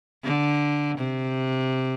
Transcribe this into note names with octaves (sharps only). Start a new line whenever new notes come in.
D3
C3